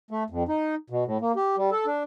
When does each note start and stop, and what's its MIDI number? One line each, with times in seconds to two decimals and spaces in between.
0.11 0.23 57
0.30 0.43 41
0.49 0.75 63
0.90 1.04 47
1.05 1.17 45
1.21 1.32 58
1.36 1.56 67
1.57 1.70 55
1.71 1.86 69
1.86 2.03 62